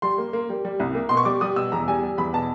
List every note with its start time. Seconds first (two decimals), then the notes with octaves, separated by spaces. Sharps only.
0.02 G3 C6
0.18 A#3
0.33 A#3
0.50 G3
0.65 G3
0.80 C2
0.95 A#3
1.09 B2 C6
1.17 C#6
1.25 G3 D6
1.41 G3 D#6
1.56 B2 E6
1.72 E2 A#5
1.88 G3 G#5
2.03 G3
2.18 E2 B5
2.33 B2 A5